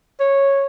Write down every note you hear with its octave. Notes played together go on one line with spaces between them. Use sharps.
C#5